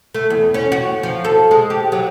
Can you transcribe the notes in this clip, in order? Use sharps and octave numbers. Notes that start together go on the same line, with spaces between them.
A3
E2
C#4
F#4
F3
A4
G#3
G4
F#3